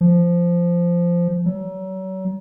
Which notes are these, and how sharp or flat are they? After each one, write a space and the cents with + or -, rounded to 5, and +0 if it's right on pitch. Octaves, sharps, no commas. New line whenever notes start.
F3 -10
F#3 +35